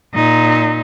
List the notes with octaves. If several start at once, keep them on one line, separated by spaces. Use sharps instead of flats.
A#2 D#4